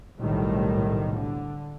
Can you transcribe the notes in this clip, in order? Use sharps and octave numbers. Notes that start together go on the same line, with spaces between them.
B1 A2 C3 D#3 G3
D3